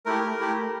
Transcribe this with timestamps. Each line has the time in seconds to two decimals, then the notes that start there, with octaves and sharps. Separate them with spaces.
0.06 A3 E4 G4 A#4
0.40 A3 E4 G4